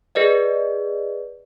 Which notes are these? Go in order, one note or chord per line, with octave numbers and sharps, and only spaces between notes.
G#4 B4 D5 D#5